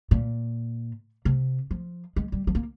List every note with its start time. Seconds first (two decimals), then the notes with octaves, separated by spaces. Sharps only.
0.11 A#2
1.25 C3
1.71 F3
2.16 G#3
2.32 G3
2.47 F3
2.55 A#3